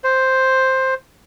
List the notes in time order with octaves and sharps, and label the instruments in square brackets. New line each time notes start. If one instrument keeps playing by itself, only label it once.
[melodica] C5